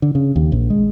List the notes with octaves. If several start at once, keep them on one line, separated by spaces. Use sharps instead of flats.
D3
C#3
D#2
A#1
G#3